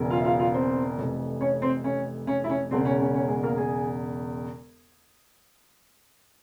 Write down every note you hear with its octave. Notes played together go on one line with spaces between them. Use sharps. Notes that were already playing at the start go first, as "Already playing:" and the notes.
Already playing: E1 E2 C#3 E3
F4 F5
E5
F4 F5
F4 F5
C4 C5
F1 F2 E3
C#4 C#5
C4 C5
C#4
C#4
E4
C#4
E1 E2 C#3 C4
C#4
C#4
C#4
G#3 G#4
A#3 A#4
G#4 G#5